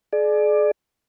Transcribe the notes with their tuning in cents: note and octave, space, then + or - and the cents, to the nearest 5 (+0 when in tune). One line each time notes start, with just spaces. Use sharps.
G#4 +35 D5 +20